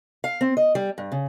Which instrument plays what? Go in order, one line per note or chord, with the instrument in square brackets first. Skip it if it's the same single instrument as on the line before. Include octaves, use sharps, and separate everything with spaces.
[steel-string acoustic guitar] F5
C4
D#5
G3
G2
C#3